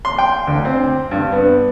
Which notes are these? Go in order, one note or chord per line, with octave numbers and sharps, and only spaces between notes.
C6
G5
D2
C4
G2
B3